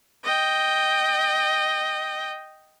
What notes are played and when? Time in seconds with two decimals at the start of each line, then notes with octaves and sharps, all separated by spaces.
0.24 D#5 G5